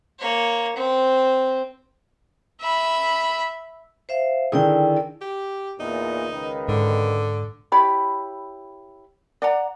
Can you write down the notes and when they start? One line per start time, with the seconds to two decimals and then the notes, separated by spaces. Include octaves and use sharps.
0.20 A#3 C#5
0.76 C4
2.61 E5 B5
4.09 C5 E5 F5
4.52 D3 D#3 E4 G#4 D5 G5
5.21 G4
5.80 E2 A#2 D#4
6.30 C#2 D#3 B4
6.68 G#2 D3
7.72 E4 G4 C#5 B5
9.42 D5 F#5 A#5